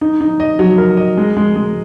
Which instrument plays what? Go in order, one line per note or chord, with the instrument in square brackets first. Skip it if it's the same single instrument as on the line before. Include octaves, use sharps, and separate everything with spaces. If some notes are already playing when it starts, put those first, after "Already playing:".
[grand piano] D#4
D#4
D#5
F#3
A#4
D#5
G#3
G#3
G#3